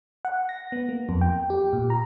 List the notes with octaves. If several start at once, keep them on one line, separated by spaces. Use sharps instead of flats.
F#5
A#6
B3
A#3
F2
G5
G4
A#2
A#5